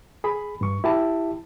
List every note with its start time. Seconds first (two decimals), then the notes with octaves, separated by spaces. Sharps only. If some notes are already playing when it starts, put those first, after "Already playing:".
0.24 G#4 B5
0.61 G2 C#6
0.84 E4 G4 A5